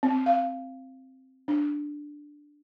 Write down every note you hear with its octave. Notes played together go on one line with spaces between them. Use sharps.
C4
F5
D4